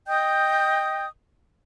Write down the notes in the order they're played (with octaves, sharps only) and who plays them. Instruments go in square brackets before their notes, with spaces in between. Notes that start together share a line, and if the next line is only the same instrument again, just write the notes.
[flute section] D#5 G5 D#6 G6